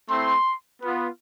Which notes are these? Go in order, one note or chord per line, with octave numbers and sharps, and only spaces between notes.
A3 C4 E4 C6
B3 F4